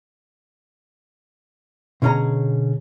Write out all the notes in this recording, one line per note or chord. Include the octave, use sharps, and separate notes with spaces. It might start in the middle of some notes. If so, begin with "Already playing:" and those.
B2 D3 C#4 G#4 A#5